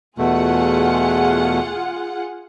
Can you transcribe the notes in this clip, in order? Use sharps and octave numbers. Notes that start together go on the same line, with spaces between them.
E2 B2 A3 F4 G#4 F#5